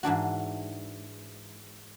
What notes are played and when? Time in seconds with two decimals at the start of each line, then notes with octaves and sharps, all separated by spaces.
0.03 G#2 E3 D4 F#4